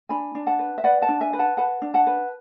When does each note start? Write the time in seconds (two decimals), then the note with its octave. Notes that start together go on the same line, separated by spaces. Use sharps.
0.09 D4 G#5 B5
0.35 D4
0.47 F#5 A5
0.59 B4
0.78 E5
0.84 B4 D5 F#5
1.02 F#5 A5
1.09 D4
1.21 E5 G#5
1.33 B4
1.39 F#5 A5
1.57 B4 F#5 A5
1.82 D4
1.94 F#5 A5
2.07 B4